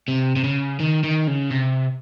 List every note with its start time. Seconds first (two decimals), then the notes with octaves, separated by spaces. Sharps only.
0.08 C3
0.36 C3
0.44 C#3
0.80 D#3
1.04 D#3
1.28 C#3
1.50 C3